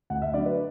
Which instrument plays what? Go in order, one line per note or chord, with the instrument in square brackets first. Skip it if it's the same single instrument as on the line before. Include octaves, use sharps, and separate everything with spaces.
[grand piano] D2 F#5
E5
D3 F#3 D5
B4